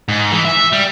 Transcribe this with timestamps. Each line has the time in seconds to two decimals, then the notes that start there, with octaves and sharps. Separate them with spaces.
0.08 G#2
0.32 E3
0.45 E5
0.73 G3